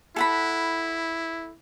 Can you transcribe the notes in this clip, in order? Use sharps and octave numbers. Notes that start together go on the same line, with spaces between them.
E4 A4 F#5 B5